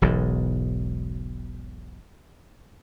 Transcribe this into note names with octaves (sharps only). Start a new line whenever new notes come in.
E1 B1 E2 G#2